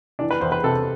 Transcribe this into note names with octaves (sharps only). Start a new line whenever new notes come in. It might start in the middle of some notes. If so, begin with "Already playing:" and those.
E3 D4
B4
E2 C5
B4
C3 A4